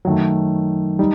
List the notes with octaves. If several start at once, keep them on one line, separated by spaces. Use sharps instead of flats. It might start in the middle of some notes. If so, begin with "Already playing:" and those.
F#2 D#3 F#3 A3
G3 D#4